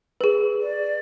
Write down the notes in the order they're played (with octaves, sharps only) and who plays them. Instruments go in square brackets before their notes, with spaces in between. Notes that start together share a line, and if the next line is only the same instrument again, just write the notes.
[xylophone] G#4 B4
[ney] D5